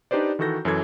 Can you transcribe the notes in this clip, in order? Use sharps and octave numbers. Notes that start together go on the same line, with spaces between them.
D4 D#4 G4 B4 C5 D5
D#3 E3 F#4 A4 G6 A#6
F#2 E3 A4 G#6